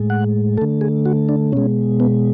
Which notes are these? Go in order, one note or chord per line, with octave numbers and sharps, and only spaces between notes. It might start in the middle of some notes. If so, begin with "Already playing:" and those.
Already playing: A2 G#3
F#5
D3 A3 A4
G#4
F#4
D4
B2 G#3 C#4
B3